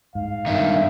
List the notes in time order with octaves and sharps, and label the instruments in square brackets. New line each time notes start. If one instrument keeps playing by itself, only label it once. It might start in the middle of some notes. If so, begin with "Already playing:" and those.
[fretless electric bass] G#2 [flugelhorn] F5
[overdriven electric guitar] G2 D#3 [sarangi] E5